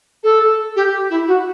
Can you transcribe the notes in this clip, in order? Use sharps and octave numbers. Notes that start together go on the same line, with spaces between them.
A4
G4
E4
F#4